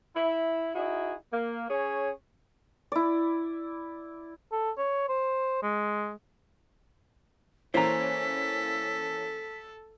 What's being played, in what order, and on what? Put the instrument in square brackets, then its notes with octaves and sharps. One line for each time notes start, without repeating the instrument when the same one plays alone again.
[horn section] E4
D#4 E4 F#4 G#4
A#3
C#4 G#4 C#5
[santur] E4 D5
[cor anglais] A4
C#5
C5
G#3
[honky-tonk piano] E3 A#3 C#4 [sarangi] A4 [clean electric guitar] C5 A#5 [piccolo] B6